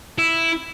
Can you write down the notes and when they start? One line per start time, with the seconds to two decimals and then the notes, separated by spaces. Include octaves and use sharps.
0.18 E4